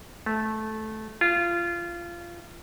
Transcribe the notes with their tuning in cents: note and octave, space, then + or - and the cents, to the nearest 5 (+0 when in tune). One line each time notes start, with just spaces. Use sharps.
A3 -15
F4 -20